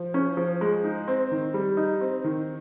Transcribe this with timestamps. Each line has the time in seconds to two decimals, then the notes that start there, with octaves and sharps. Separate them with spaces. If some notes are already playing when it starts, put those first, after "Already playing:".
Already playing: F3
0.14 C#4
0.37 F3
0.61 G#3
0.84 D#4
1.08 C4
1.31 D#3
1.54 G3
1.77 D#4
2.01 C4
2.24 D#3